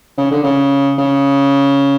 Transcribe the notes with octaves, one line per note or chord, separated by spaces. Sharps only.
C#3
D3
C#3
C#3